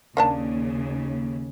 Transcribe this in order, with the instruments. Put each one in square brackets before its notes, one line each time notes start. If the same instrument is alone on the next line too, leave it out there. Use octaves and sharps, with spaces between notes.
[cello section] D#2 C#3 [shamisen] A#3 D4 A5